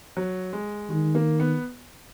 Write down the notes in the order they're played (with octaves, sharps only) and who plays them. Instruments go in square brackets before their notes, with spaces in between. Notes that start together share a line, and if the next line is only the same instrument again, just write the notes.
[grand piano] F#3
G#3
[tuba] D#3 [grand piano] G#3
[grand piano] A#3
B3